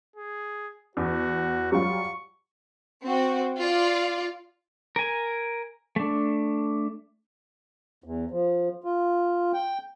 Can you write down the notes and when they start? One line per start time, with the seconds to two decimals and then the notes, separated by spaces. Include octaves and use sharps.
0.16 G#4
0.97 E2 F#4
1.72 F#3 G3 F4 C#6
3.02 C4 F#4
3.60 F4 D5
4.96 A#4 G#5
5.96 A3 D4
8.04 E2
8.31 F3
8.84 F4
9.53 G5